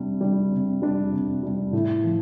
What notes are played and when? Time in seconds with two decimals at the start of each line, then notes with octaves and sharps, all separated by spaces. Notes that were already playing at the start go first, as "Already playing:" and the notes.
Already playing: C3 G3 D4
0.21 G3 D4
0.51 C3
0.82 G3 D4
1.12 C3
1.43 G3 D4
1.73 A2
2.04 F3